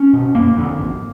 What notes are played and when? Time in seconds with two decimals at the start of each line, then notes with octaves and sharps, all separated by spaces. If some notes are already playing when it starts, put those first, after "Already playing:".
Already playing: C#4
0.13 B2
0.35 F#1 A#3
0.57 F2 D3
0.79 G#1